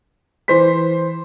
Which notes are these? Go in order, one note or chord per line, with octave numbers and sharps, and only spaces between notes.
E3 C5 C6 B6